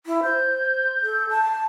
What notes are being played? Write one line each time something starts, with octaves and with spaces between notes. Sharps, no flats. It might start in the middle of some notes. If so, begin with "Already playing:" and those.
E4
C5 G6
A4
A5